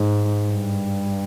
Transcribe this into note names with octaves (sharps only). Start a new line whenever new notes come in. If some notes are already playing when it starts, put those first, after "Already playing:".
Already playing: G#2
G2